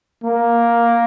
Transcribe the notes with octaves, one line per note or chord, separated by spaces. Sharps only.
A#3